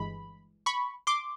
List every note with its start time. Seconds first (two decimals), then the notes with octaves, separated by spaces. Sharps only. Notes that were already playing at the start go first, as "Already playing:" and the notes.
Already playing: G1 G2 E3 G#3 B5
0.66 B5 C#6
1.07 C6 D6